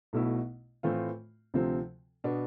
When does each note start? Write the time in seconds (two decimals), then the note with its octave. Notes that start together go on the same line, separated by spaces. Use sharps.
0.13 B1 B2 A3 E4
0.83 A2 E3 A3 C4 F4
1.54 D2 C3 F3 C4
2.24 B2 B3 D4